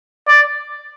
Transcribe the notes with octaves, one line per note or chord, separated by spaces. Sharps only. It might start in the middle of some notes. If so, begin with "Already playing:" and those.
D5